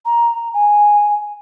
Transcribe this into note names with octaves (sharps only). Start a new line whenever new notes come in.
A#5
G#5